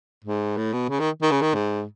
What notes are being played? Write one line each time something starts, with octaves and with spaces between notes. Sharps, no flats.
G#2
A2
B2
C#3
D#3
D#3
C#3
D#3
G#2